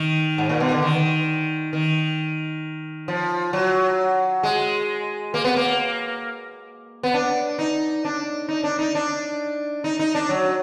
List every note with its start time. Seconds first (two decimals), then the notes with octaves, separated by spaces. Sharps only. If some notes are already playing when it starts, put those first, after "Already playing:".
Already playing: D#3
0.38 G#2
0.49 A#2
0.60 B2
0.72 D3
0.82 D#3
1.73 D#3
3.08 F3
3.53 F#3
4.43 G#3
5.34 A#3
5.44 B3
5.56 A#3
7.03 B3
7.14 D4
7.59 D#4
8.05 D4
8.49 D#4
8.64 D4
8.79 D#4
8.95 D4
9.84 D#4
10.00 D#4
10.15 D4
10.29 F#3